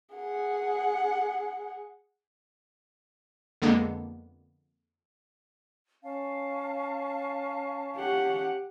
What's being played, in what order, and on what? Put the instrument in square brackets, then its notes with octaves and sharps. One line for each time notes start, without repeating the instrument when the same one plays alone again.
[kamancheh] G#4 F#5
[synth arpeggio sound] F2 D3 G#3 A#3 B3 D4
[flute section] C#4 F5 A5
[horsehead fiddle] G4 F#5